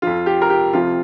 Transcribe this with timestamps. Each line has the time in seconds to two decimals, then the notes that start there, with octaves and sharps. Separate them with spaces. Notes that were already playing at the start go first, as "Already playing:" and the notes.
0.02 F2 F3 F4
0.26 G4
0.42 A#4
0.50 G4
0.73 F2 C3 F3 F4